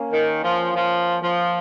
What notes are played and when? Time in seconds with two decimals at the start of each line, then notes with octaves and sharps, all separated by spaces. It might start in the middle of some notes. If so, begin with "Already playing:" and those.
Already playing: A#3 C#4
0.11 D#3
0.43 F3
0.74 F3
1.22 F3